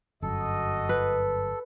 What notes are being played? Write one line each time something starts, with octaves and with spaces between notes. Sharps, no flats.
G1 F#2 F#4 A4 D#5
B4